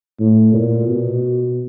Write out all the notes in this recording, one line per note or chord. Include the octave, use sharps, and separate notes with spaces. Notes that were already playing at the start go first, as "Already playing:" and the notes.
A2
A#2
B2